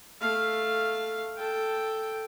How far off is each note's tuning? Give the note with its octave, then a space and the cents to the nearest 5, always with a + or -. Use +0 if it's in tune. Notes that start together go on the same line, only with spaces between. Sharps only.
A3 +0 F5 +0
A4 +0 G5 +0